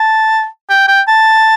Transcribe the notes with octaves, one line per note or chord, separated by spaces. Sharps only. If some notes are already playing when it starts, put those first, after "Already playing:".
Already playing: A5
G5
G5
A5